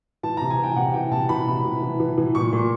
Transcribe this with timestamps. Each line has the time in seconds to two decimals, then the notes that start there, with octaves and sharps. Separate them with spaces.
0.23 E3 A5
0.37 C3 A#5
0.50 G#5
0.59 E3 G5
0.71 G5
0.76 C3 F#5
0.94 E3 G5
1.11 C3 A5
1.29 E3 B5
1.47 C3
1.65 E3
1.82 E3
2.00 E3
2.18 E3
2.35 A#2 C#6
2.53 A#2